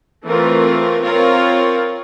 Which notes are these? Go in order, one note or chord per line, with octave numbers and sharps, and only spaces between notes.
E3 A3 C4 F4 A#4
C4 F4 A#4 C#5